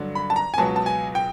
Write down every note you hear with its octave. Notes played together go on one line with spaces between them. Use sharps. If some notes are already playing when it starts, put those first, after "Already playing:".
Already playing: G2 D3 F#3
B5
A5
A#5
G#5
C#2 B2 F#3 A5
A5
G#5
G5